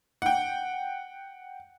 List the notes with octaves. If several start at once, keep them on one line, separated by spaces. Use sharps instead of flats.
F#5 G5